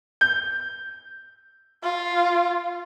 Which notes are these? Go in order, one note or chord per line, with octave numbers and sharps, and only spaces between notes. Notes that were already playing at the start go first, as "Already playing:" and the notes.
G6
F4